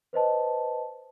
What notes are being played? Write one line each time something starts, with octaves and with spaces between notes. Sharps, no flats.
B4 C5 D#5 A5